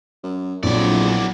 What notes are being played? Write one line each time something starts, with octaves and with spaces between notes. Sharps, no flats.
F#2
A#1 F2 F#3 B3 D4 E4 G#4 D5